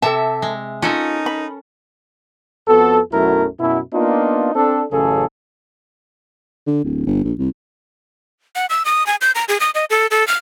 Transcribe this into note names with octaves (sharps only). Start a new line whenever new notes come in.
C3 A4 E5 A5
G#3
C#4 D#4 F4 A4 A#4
B5
F2 B3 F#4 A4
B1 F#2 F#3 A3 E4 A#4
F#2 B2 E4
A#3 B3 D4 D#4 F4
C4 D4 A4
A1 F#2 C#3 G#4 A4
D3
D1
G1
A#1
C2
F#5
E6
D#6
G#5
G6
A#5
G#4
D#6
D#5
A4
A4
F6